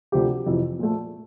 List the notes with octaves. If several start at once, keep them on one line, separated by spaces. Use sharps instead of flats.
D2 C3 F3 C4 G4
F2 C3 E3
A#2 F3 A3